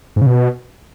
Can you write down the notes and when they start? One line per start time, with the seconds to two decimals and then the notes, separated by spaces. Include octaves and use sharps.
0.16 G#2
0.21 C#3
0.26 B2